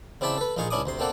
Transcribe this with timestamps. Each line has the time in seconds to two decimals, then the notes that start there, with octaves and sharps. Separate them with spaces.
0.21 C#3 C4 E4 D5 E5 A5
0.38 A4 B4
0.56 A#1 A#2 D#4 F4 G#4 C#6
0.71 C#2 C#4 D4 E4 D6 D#6
0.86 D2 C3 C6
0.99 A#3 C4 D4 A4 F#5